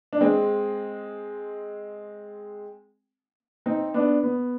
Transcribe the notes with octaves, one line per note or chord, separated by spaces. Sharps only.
D4
G#3 C4
C4 D#4
B3 D4
B3